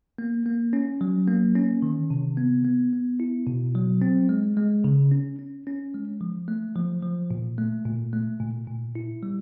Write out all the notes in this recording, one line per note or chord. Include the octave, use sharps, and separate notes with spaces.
A#3
A#3
C#4
F#3
A#3
C#4
D#3
C3
B3
B3
B3
E4
B2
F#3
C4
G#3
G#3
C#3
C#4
C#4
C#4
G#3
F3
A3
F3
F3
A#2
A3
A#2
A3
A#2
A#2
E4
G3